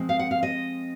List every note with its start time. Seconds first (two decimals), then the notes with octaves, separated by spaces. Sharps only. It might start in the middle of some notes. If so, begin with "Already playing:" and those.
Already playing: F3 G#3 C4
0.09 F5
0.19 F#5
0.31 F5
0.43 D#5